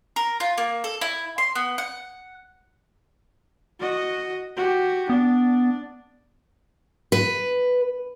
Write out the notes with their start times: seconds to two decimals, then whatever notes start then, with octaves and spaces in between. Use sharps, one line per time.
0.16 A#4
0.40 F4
0.58 A#3
0.84 A4
1.01 E4
1.38 C6
1.55 B3
1.78 F#5
3.79 F#4 D#5
4.56 F#4 G4
5.10 B3 D4
7.12 B4